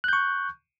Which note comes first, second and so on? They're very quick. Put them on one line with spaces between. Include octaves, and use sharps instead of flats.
F#6 G6 C#6